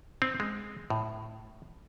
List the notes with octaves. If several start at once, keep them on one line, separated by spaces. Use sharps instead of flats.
C4
G#3
A2